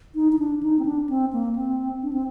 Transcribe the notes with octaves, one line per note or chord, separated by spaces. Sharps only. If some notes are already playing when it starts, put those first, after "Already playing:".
D#4
D#4
D4
D#4
C4
D4
C4
A#3
C4
D4
C4